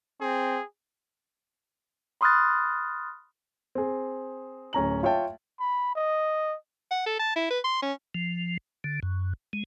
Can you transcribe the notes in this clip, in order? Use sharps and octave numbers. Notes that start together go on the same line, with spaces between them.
C4 G#4
B5 C6 D#6 F6 F#6 A6
C4 G#4
D1 C#4 A#5 F#7
F4 C#5 E5 G5 A5
B5
D#5
F#5
A4
A5
E4
B4
C6
C#4
F3
D3
F#2
G#3